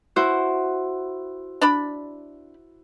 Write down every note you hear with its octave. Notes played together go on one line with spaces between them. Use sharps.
E4 F#4 C5
D4 D5 B5